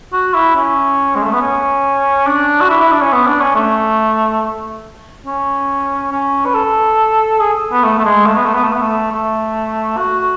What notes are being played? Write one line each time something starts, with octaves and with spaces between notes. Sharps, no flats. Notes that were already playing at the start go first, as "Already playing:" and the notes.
F#4
E4
C#4
G#3
A3
B3
C#4
D4
F#4
E4
E4
D4
C#4
B3
D4
C#4
A3
C#4
C#4
B4
A4
G#4
B3
A3
A3
G#3
A3
B3
A3
B3
A3
B3
A3
A3
F#4